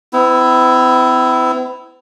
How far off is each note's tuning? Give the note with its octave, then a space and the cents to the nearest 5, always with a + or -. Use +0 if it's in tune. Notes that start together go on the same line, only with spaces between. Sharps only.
C4 -45 E4 +0